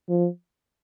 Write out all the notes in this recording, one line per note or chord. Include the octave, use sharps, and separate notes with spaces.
F3